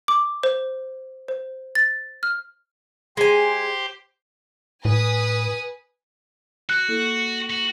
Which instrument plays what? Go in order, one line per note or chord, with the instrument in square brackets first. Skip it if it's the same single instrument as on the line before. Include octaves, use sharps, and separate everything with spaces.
[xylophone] D6
C5
C5
A6
F6
[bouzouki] G#3 G#5 [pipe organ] G4 C5 C6
[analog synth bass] A2 [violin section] B4 G#5 D#6
[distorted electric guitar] F#4 [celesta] F#6
[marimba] A#3 E4 A4
[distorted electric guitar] F#4